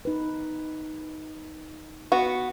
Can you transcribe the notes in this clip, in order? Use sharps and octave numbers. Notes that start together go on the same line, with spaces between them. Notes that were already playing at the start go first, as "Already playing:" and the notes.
D#4 B4
B3 F#4